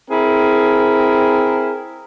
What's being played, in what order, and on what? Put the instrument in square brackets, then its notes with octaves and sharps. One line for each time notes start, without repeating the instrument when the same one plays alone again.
[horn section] C4 E4 G#4 A#4